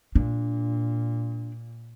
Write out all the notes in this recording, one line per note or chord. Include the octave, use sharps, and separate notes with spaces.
A#2 D4